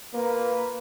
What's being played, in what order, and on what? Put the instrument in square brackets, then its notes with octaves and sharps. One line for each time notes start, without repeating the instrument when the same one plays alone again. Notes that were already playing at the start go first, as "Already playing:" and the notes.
[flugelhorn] A#3 [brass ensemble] F4 B4